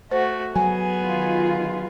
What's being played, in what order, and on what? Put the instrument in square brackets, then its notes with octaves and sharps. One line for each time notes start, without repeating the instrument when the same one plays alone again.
[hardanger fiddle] A3 F#4 [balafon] C5
[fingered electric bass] F#3 [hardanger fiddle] B3 G#4 [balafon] G#5
[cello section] D#3 F4